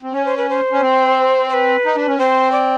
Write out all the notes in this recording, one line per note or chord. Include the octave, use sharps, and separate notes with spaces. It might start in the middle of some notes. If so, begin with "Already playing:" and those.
C4
C#4 C#5
C5
B4
C5
C#4
C4
C5
B4
D#4
D4
C#4
C4 C5
D5